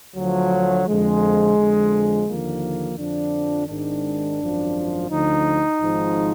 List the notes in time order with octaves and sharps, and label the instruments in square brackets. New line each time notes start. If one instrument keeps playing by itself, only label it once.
[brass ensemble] D2 D3 F3 F#3
F2 D3 F3 G#3
F2 D3 F3
D#2 D3 F3 A#3
F2 D3 F3 D4
G#1 G#2 D#3 D4
G#1 F#2 F3
D2 D3 F3 D#4
G#1 G#2 F3